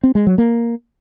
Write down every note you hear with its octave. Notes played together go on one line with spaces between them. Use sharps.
C4
G#3
F#3
A#3